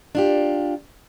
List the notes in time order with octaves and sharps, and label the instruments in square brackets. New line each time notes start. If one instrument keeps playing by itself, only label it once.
[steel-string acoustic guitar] D4 F4 G4